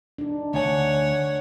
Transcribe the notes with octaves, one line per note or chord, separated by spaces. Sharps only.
D4 D#4
D2 C#5 F#5 G#5